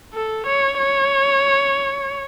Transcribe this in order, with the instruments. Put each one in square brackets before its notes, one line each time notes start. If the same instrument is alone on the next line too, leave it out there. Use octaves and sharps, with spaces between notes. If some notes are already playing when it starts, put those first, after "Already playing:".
[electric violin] A4
C#5
C#5